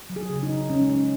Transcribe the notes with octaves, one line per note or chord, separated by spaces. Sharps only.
F#3
G#4
C#3
D#4
C#3
G#3 C#4
G#3 C#4